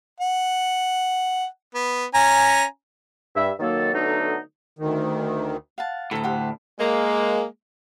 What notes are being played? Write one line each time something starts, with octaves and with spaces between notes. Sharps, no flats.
F#5
B3
C#4 G#5 A#5
G2 E5
D#3 F#3 A#3 A4
D3 F#3 A3 B3 D4 D#4
D2 D#3
F5 F#5 A5
D2 A2 A4 A#5
G4 C5 F#5
G#3 A#3